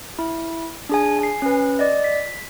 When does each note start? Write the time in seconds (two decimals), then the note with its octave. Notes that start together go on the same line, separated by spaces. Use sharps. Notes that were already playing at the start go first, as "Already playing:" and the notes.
0.19 E4
0.89 D4 G#4 G#5
1.19 G#5 C7
1.42 C#4 B4
1.79 D5 D#5
2.04 B6